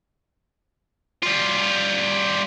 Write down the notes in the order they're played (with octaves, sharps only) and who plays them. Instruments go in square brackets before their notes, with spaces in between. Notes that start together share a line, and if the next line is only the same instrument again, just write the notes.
[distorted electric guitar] G3 F4